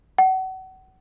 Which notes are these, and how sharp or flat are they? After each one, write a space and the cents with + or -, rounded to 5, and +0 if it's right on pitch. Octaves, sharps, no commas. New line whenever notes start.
F#5 +35